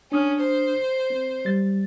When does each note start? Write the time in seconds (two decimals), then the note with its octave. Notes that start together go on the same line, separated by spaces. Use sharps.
0.12 C#4 D4 D#6 F6
0.42 C5
1.10 C4
1.45 G3 A6